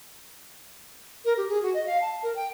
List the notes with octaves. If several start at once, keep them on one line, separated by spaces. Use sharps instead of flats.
A#4
G4
G#4
F#4
D#5
F5
A5
A#4
G5